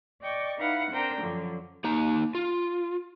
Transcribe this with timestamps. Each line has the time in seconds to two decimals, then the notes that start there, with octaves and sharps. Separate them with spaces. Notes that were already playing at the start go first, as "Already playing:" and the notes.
0.20 D5 D#5 G5 C#6 D6
0.57 D#4 E4 B4 F5 F#5
0.91 C4 D4 A#4 C5 G5 A#5
1.21 F#2 D3 F3 F#3
1.84 A#3 D#4 A#5
2.35 F4